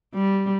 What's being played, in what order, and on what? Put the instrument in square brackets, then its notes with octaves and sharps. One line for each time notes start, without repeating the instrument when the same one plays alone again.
[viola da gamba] G3